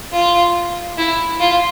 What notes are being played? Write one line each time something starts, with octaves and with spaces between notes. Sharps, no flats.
F4
E4
F4